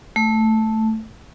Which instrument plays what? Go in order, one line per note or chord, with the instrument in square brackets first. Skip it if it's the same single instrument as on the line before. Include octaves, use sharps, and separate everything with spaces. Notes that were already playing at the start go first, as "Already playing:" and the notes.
[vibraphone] A3